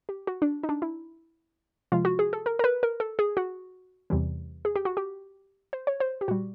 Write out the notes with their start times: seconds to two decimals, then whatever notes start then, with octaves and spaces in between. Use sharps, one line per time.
0.09 G4
0.27 F#4
0.42 D4
0.63 D#4
0.69 D4
0.82 E4
1.92 C3 F3 G#3 F4
2.05 F#4
2.19 G#4
2.33 A4
2.46 A#4
2.59 A#4
2.64 B4
2.83 A#4
3.00 A4
3.19 G#4
3.37 F#4
4.10 E2 C3 E3 G3
4.65 G#4
4.76 G4
4.85 F#4
4.97 G4
5.73 C5
5.87 C#5
6.00 C5
6.21 G4
6.28 A#2 G3 F#4